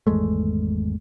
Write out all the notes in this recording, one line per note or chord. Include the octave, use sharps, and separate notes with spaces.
G#1 E2 G#3 A3